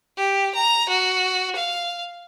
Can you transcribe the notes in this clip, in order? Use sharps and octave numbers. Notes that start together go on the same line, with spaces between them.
G4
A#5
F#4
F5